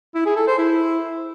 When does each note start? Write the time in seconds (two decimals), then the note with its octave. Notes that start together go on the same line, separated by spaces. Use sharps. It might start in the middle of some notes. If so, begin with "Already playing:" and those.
0.15 E4
0.26 G#4
0.36 A4
0.47 C5
0.58 E4